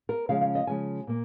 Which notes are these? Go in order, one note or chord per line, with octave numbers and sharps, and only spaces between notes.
A#4
C#3 F3 G#3 C#4 F5
F5
D#5
C#3 F3 G#3 C#4 G#5
A#2 A#3